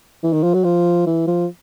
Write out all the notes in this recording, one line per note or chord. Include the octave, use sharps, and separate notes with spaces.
E3
D#3
F3
F#3
F3
E3
F3